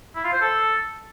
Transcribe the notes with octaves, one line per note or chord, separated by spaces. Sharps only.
E4
F4
C5
A4